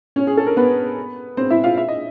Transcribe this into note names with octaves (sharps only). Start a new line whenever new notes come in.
C#4 C#5
G#4
A4
A#4
B3 B4
C4 C5
E4 E5
F4 F5
E5
D#5